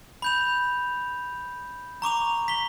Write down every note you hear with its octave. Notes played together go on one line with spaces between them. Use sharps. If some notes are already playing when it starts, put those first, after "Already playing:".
B5 G6 F7
A#5 C#6 D6 F7
B6 G7